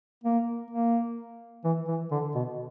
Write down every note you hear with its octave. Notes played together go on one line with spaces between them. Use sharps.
A#3
A#3
E3
E3
D3
B2